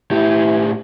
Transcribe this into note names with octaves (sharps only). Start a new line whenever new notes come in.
A2 E4 G4